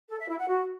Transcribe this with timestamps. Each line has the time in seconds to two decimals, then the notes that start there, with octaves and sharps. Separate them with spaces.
0.09 A4
0.19 E5
0.28 E4
0.37 F#5
0.47 F#4